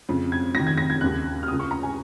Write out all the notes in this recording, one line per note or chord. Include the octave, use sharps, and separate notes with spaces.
F2 C#3
G#6
F2 D#3 A#6
G#6
A#6
G#6
D#2 C#3 F#6
F6
C#2 C#3 D#6
C#6
A#5
G#5